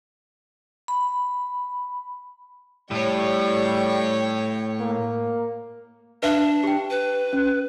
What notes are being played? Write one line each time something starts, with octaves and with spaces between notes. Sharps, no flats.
B5
A2 G3 C#5 G5
A#3
D4 B4 E5 F5
G4 G5
B4
C#4